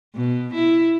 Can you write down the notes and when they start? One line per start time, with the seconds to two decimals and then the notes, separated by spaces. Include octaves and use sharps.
0.15 B2
0.54 E4